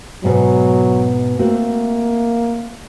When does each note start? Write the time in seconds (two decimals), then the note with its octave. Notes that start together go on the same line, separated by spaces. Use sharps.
0.24 G#2 B2 F#3
1.39 A3 A#3 C4 F#4